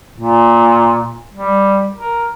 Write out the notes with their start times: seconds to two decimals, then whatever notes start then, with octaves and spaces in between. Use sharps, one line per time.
0.18 A#2
1.34 G3
1.93 A#4